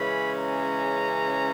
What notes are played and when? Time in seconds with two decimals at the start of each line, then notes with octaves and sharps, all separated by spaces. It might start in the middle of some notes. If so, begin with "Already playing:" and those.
Already playing: C#3 E3 G#3 C#4 B5
0.34 A#5